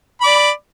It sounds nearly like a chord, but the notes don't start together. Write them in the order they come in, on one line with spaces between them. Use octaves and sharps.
B5 D6 D5